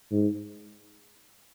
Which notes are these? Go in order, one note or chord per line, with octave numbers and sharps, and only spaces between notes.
G#2